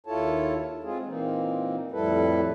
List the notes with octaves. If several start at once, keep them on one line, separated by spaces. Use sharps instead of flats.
D#2 E4 F4 A4 C#5 A5
G#3 C4 F4 G#4
A#2 E3 A#3 C4 D#4
F2 A2 G3 E4 A4 B4